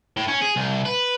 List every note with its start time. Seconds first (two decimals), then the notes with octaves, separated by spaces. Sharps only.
0.17 A2
0.28 C#4
0.42 G#4
0.56 C2
0.85 B4